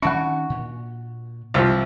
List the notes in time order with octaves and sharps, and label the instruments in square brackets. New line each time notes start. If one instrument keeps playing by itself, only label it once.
[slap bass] D#3 C#4 [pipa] D4 E4 F#4 [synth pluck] F#5 C#6
[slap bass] A#2
[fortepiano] C2 F3 [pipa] F4 C5 E5